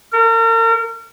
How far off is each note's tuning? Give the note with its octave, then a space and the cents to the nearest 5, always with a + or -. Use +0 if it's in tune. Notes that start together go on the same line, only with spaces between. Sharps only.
A#4 -40